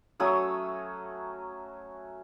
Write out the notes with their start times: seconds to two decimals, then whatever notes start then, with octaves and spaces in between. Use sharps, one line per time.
0.20 F#3 A3 C#4 D#6